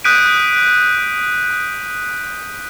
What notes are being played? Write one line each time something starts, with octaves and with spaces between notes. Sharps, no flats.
D#6 F#6 G6 B6 D7 D#7